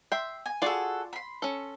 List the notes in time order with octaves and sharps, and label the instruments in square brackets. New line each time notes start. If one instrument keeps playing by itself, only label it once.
[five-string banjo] E5 G5 [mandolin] C6
[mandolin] G#5
[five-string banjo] F4 D5 [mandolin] F#4 G#4 A4
[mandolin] B5 C6
[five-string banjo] C#4 A4